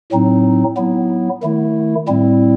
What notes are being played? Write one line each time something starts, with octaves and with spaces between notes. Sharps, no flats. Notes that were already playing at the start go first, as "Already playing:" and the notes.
A2 F#3 C4 D#4
F#3 B3 E4
D#3 A3 E4
A2 G3 C4 E4